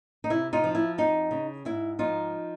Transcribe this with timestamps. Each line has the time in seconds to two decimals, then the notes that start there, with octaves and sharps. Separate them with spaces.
0.24 D#4
0.30 C3 E4
0.53 D#4 F4
0.64 F3
0.75 E4
0.98 F2 D#4
1.31 C#3
1.65 G#2 E4
1.99 F3 D#4 F4